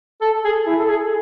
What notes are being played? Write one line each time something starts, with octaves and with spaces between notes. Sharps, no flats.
A4
G#4
E4
A4
G#4